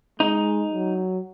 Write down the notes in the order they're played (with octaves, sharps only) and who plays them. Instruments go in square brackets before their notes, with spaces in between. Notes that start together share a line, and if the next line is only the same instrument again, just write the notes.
[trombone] G#3 [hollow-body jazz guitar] D#4
[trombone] F#3